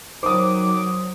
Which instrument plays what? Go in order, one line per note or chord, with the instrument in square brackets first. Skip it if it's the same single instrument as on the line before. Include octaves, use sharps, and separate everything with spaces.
[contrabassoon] D#3 [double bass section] F#3 [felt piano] C5 D#6 [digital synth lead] D6